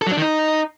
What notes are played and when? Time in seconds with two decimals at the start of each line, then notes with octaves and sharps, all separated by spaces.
0.02 A4
0.07 F#3
0.12 D4
0.17 D#3
0.22 D#4